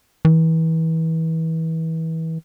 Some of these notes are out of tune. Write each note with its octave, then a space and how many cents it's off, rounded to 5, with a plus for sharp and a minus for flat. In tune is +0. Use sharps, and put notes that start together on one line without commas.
E3 -30